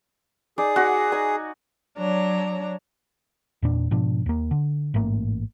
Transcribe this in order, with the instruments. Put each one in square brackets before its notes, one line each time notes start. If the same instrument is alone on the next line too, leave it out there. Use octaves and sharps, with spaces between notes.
[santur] D#4 D5 [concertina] G#4
[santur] F#4 F#5 C6
D#4 G#5 D6
[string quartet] F#3 D4 C#5 A#5
[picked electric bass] E2 A#2 D4
G#2 B2 F3 D4
D#2 A#3
D3
A1 G#2 A3 A#3